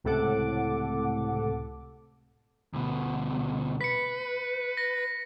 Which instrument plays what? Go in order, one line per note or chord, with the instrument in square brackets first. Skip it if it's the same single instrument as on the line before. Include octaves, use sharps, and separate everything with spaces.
[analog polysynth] C#2 A2 C3 A4 F#5 D6
[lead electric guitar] D2 B2
[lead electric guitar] B4 [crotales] B6 C#7
[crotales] A#6